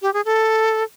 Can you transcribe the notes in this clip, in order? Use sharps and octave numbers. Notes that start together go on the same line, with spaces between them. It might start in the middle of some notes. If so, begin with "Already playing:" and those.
G4
G#4
A4